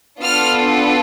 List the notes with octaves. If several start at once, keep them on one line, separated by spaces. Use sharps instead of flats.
B3 D4 F4 A4 F6